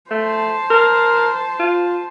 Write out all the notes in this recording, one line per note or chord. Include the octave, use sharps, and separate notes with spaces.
A3 C5 A5
A#4
F4